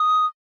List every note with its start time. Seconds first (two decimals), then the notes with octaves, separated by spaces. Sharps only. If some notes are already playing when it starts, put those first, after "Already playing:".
Already playing: D#6